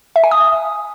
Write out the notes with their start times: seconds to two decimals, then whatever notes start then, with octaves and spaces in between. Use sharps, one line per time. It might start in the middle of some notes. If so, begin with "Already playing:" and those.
0.16 E5
0.24 G#5
0.31 D#6